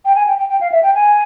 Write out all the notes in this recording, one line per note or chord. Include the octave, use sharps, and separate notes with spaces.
G5
G#5
G5
G5
G5
F5
E5
G5
G#5